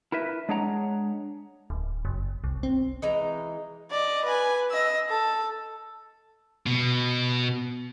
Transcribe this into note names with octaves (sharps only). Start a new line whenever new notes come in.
E4 A#4 B4 E5
G#3 D4 G#4 C#5 F#5 A#5
D1
F#1
C2
C4
E3 G#3 D#4 A#5
D5 D#5
B4 G#5
D#5 E6
A4
B2